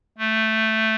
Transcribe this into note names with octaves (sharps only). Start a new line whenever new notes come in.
A3